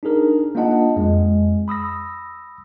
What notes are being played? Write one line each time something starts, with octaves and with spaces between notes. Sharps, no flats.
D4 D#4 G#4 A#4
A#3 D4 F4 D#5 F#5 A5
F2 G#3
B5 D#6 E6 A#6